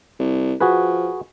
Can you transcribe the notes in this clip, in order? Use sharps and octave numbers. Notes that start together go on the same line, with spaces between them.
C2
F3 F#4 G#4 B4